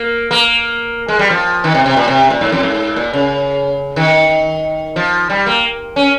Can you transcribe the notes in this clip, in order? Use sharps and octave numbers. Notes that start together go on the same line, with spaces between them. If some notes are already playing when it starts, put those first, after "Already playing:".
Already playing: A#3
A#3
G#3
G3
F3
D#3
C3
C3
A#2
C3
A#2
G#2
F2
G#2
A#2
C#3
D#3
F3
G3
A#3
C#4